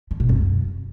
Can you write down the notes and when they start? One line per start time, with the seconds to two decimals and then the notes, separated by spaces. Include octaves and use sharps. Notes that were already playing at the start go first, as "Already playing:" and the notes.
0.11 D3
0.20 B2
0.29 F#2